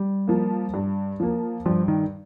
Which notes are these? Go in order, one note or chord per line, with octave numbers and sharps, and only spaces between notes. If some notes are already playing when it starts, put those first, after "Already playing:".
Already playing: G3
F3 A#3
G2
F3 A#3
G2 F3
D#3